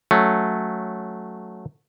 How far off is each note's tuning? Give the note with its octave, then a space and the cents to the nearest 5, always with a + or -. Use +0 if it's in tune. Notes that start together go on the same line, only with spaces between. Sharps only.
F#3 -5 A3 -5 C#4 +0